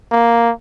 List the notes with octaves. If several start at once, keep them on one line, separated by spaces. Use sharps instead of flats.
A#3